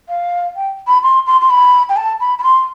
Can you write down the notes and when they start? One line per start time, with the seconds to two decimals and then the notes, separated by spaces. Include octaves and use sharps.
0.09 F5
0.56 G5
0.87 B5
1.03 C6
1.26 C6
1.41 C6
1.50 B5
1.89 G5
1.96 A5
2.20 B5
2.38 B5
2.44 C6